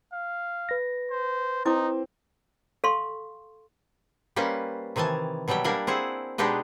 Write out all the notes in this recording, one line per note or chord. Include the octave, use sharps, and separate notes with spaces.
F5
B4 A#6
C5
C4 D#4 E4 D6
A4 F5 C6 C#6
G3 A#3 C#4 B4 C5
C3 D#3 E3 G#5 A5
B2 F#3 G3 E4 G5
G3 A#3 D4 A#4 G#5
C4 E4 G#4 F#5
B2 G#3 D4 D#4 G4 B4